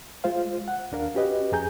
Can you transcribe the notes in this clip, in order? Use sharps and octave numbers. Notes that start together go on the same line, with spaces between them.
G#3 F4 C5 F5
F#5
D#2 D4 A#4 F5
C#4 F#4 G4 B4 D#5
F2 G#4 G#5 A#5 G6